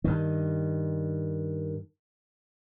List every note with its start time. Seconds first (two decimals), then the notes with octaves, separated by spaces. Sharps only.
0.04 G2 D#3